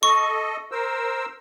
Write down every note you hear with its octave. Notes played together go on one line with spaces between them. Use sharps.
A4 D#5 C#6
A#4 C5 E6